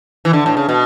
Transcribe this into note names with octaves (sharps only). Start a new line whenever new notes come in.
E3
D3
A2
C#3
B2